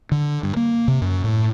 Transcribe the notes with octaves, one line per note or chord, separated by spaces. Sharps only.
D3
G2
A#3
C3
F#2
A2